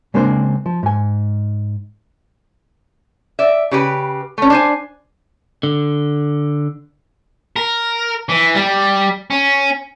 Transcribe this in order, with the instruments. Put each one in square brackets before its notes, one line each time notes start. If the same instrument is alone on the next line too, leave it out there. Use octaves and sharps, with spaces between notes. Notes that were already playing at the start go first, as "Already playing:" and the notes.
[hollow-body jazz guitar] C#3 G#3 A#3 C4 D4 C5
F3
G#2 G#5
[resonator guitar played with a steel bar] D5 E5
C#3 G4 B4
A3 C#4
D4 C5 G#5
[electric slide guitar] D3
[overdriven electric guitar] A#4
E3
G3
C#4